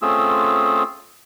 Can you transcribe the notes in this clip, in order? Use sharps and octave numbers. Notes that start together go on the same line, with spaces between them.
A3 C4 C#4 F4 G#4 E6